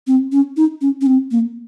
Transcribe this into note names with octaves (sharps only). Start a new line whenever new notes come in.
C4
C#4
D#4
C#4
C#4
C4
A#3